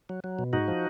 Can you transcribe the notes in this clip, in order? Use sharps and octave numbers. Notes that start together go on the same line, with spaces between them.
F#3
F#3
B2
G#2 D#4 F#4
F3